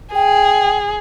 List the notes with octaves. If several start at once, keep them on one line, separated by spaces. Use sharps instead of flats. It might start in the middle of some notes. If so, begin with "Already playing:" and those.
G#4 G5